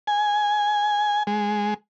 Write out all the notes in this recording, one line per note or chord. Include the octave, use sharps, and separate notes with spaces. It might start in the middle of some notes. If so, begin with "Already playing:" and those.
G#5
G#3